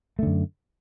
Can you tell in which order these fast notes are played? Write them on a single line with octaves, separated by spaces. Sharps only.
A3 D3 F#2